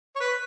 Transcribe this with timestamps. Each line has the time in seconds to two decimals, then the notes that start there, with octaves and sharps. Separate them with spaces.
0.16 C#5
0.20 B4